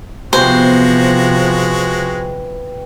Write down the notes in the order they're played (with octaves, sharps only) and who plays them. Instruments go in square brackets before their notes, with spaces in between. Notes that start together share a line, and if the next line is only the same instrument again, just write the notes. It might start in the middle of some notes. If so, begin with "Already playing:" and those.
[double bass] C3 F3 [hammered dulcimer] E3 B3 G4 [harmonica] G#3 F#4 [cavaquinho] C5